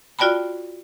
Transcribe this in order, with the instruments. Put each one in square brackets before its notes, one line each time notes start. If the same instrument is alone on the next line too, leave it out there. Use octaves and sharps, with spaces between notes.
[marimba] F4 F#4 D5 G5 A5 B5